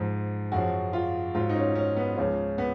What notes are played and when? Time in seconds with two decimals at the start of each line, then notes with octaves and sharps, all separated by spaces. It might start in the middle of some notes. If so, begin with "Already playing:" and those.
Already playing: G#2 F3
0.52 F#2 C#3 F3 F#4
0.93 F4
1.34 G#2 F#3 F4
1.49 D#4
1.56 C#4
1.75 C#4
1.97 B3
2.16 C#2 C#3 F3 C#4
2.58 B3